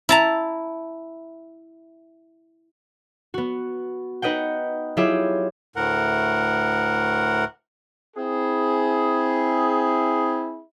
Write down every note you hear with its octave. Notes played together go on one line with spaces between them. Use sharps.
E4 A5 A#5
B3 F#4
D#4 B4 D#5 F#5 G5
F#3 E4 F4 G4 G#4 E5
D2 A2 A#4 F#5
C4 E4 G#4